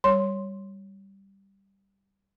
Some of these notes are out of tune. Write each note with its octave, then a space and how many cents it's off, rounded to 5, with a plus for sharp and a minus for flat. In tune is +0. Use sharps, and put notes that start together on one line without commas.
G3 +0 C#5 +0 C6 +0